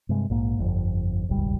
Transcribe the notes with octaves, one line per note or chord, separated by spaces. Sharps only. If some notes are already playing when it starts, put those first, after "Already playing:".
G2 C3 G#3
A#1 G#2 A#3
G1 F2
D#1 G#1 C#2 G3